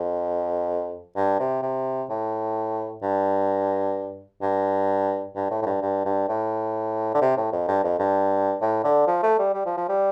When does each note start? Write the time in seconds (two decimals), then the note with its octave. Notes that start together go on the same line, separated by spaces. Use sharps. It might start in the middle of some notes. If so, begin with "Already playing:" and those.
Already playing: F2
1.16 G2
1.40 C3
1.63 C3
2.10 A2
3.02 G2
4.42 G2
5.36 G2
5.51 A2
5.62 A2
5.66 G2
5.82 G2
6.05 G2
6.29 A2
7.14 D3
7.21 C3
7.37 A2
7.53 F2
7.68 G2
7.84 F2
7.99 G2
8.61 A2
8.84 D3
9.07 F3
9.23 A3
9.39 G3
9.54 G3
9.66 F3
9.77 F3
9.89 G3